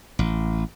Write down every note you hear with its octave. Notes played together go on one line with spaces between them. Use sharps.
A1